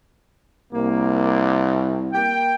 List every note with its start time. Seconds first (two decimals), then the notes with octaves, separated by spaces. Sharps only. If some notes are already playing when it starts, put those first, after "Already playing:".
0.73 C2 A#3
2.13 A#3 G5